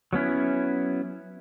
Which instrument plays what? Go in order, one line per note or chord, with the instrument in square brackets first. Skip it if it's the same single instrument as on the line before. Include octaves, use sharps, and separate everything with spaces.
[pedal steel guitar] F#3 B3 C#4 E4